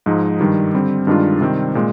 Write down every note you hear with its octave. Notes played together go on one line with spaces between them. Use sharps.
G#2 F3 G#3 D#4
G2 D#3 G3
D3 G3 C4
G2 D#3 G#3 D4 F4
C3 D#3 G3 C4
A#2 G#3